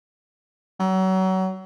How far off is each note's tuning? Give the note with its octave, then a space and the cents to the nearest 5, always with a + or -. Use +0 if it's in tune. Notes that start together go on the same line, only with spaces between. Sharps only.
F#3 +30